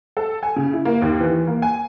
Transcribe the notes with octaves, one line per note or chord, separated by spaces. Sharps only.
A4
G#5
C#3
E4
A#3
D#2
E3
A#3
G#5